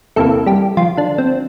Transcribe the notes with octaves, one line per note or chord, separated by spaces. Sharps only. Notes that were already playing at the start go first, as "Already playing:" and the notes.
E2 C3 E3 A3 A#3 A4
G3 G4
F3 F4
D3 D4
C4